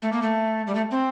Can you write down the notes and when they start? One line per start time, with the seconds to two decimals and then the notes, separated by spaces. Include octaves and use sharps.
0.02 A3
0.12 A#3
0.22 A3
0.67 G3
0.75 A3
0.91 C4